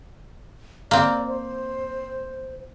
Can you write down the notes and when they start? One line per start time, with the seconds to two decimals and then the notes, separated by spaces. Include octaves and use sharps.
0.91 A#3 C4 D5
1.27 C5